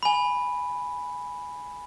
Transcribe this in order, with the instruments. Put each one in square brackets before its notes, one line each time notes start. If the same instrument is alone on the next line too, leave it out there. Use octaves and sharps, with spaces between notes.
[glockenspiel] G#5 B5